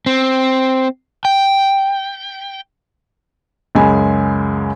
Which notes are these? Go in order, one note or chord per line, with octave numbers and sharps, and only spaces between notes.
C4
G5
C#2 F#2 G#3 D#5 G#5 B5